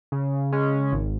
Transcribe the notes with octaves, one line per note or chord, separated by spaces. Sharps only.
C#3
G#3 C#4
G#1